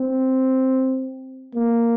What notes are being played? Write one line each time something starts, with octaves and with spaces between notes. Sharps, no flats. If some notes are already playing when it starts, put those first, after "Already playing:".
Already playing: C4
A#3